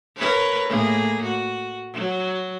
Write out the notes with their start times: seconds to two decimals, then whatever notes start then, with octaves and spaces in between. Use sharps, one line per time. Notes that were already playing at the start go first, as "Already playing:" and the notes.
0.17 A#4 B4 C#5
0.68 A2 A#3 G#4
1.23 F#4
1.93 F#3